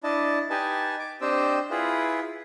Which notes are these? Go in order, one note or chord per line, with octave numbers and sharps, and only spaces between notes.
D4 E4 D#5 A5
D#4 G4 B4 D#5 G#5 A5
D6
C4 D4 G4 C5 D#5 E6
E4 F4 G#4 B4